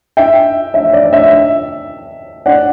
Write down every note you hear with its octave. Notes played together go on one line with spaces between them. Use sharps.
E5 G5
E5
D5
E5
D5 F#5